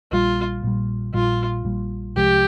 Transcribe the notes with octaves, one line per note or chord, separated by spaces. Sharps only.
A#1 A#2 G3 F4
A#1 A#2 G3
A#1 A#2 G3 F4
A#1 A#2 G3
C2 C3 F3 G#3 G4